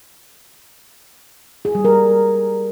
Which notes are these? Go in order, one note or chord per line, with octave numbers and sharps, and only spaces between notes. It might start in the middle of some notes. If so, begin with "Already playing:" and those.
G#4
G3
A#4